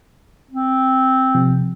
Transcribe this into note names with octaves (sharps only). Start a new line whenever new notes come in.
C4
C3 F3